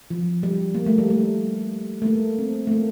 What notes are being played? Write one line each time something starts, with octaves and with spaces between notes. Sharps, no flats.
F3
G3
A#3
A3
G3
A3
A3
A#3
C4
A3
A#3